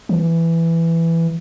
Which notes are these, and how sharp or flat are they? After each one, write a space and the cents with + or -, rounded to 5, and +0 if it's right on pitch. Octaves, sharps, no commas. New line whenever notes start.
E3 +10